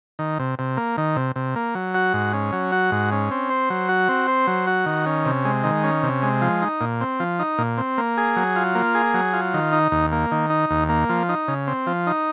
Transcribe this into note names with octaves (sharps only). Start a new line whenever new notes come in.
D#3
C3
C3
A#3
D#3
C3
C3
A#3
F#3
F#4
G#2
C#4
F#3
F#4
G#2
C#4
C4
C5
F#3
F#4
C4
C5
F#3
F#4
D#3
C#4
C3
G#3
D#3
C#4
C3
G#3
F3
D#4
A#2
C4
F3
D#4
A#2
C4
A#3
G#4
F#3
F4
A#3
G#4
F#3
F4
D#3
D#4
D#2
A#3
D#3
D#4
D#2
A#3
F3
D#4
C#3
C4
F3
D#4